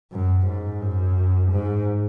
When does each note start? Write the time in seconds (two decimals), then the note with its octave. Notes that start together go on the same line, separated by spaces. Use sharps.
0.12 F#2
0.47 G#2
0.82 F#2
1.51 G#2